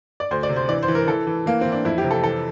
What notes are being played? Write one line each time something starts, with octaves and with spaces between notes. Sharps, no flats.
D5
D2 C5
D5
C3
C5
E3 D5
C5
E3
A#4
E3 A4
E3
E3 A#3
E3 C4
D4
F2 E4
G4
C3
A4
E3 A4